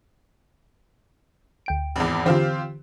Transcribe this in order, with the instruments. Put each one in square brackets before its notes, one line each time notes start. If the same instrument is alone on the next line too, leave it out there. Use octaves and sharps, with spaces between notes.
[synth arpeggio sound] D2 G5 D7
[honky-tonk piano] G#1 E2
[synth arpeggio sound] D3 E3 [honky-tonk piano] C4 F4 G4